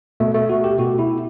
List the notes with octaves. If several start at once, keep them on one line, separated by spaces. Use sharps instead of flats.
B2 A3
A3
F#4
G4
B2 F#4
E4